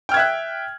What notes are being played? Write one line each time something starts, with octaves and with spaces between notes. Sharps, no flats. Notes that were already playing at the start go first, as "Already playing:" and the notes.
E5 G5 F6 F#6 G#6